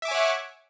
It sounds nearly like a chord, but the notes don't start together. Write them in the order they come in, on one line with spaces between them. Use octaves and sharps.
E5 D6 G#5 C#5 F#5